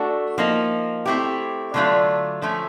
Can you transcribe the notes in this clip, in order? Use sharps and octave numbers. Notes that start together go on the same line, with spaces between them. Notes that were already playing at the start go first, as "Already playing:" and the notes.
Already playing: A3 D4 F#4 A4
F3 A#3 D#4
A3 C4 E4 G4
D3 F#3 A3 D4 F4
F3 A3 C#4